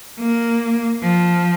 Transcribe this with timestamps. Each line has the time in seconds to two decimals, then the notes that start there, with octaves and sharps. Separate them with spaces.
0.19 A#3
1.03 F3